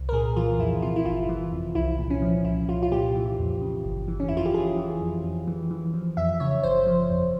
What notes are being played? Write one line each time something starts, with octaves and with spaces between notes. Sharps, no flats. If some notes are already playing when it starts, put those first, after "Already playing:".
Already playing: C2
A#4
A#2 G#4
E3 F4
F2 E4
C3 F4
E4
G1 F4
E3
F2
C2 E4
A#2
C#4
F3
C2 E4
C2 F4
F4
A#2 G4
E3
F2
C#3
G1
E3
C#4
F2 E4
F4
G4
E3 G#4
E3
F2
F2
E3
E3
F3
F2 E5
C#3 C#5
G1 C5
F3
F2